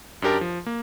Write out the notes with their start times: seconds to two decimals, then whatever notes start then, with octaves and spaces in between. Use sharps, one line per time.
0.22 F#2 D4 G4 A#4 A5
0.41 F3
0.66 A#3